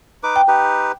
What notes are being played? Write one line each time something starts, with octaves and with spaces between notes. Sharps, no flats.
D#4 B4 D6
G5
D#4 G4 B4